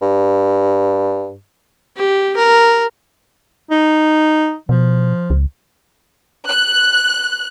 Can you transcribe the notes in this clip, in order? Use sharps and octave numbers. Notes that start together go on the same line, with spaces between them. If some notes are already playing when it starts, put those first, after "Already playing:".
G2
G4
A#4
D#4
B2 F3
C#2
F#6